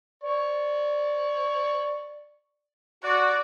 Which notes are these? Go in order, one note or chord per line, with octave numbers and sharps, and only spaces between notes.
D5 C#6
F#4 D5